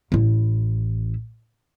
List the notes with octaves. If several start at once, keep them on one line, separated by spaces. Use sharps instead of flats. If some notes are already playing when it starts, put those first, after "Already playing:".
A1 E4